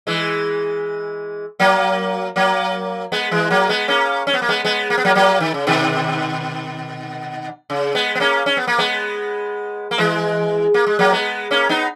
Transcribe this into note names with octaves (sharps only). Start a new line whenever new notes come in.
E3 G#3
F#3 A#3
F#3 A#3
G#3 B3
E3 G#3
F#3 A#3
G#3 B3
A#3 C#4
C#4
B3
A#3
G#3 B3
G#3 B3
A#3
B3
F#3 A#3
F#3 A#3
D#3
C#3
B2 D#3
C#3
G#3 B3
B3
A#3 C#4
C#4
B3
A#3
G#3 B3
A#3
E3 G#3
A#3
G#3
F#3 A#3
G#3 B3
A#3 C#4
B3 D#4